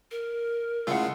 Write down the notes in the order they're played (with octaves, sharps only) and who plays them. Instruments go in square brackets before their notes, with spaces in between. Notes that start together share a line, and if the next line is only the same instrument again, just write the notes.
[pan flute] A#4
[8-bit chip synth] C#3 G#3 F4 [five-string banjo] A3 E4 F#5